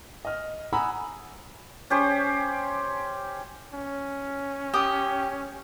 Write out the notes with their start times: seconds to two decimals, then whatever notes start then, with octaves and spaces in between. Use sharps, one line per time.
0.25 D#5 F6
0.73 F#5 G#5 A#5 B5 D#6 E6
1.90 C#4 G4 C5
3.73 C#4
4.74 G4 D#6